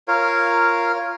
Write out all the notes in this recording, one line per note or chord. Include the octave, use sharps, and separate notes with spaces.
F4 A#4 C#5 F5